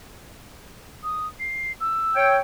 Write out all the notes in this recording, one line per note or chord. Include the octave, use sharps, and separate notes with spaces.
D#6
C7
E6
C#5 G5